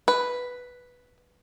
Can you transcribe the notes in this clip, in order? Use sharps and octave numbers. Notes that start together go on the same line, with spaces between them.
B4